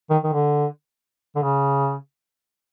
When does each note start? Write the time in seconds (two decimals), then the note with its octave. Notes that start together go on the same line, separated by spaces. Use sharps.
0.10 D#3
0.24 D#3
0.33 D3
1.35 D3
1.42 C#3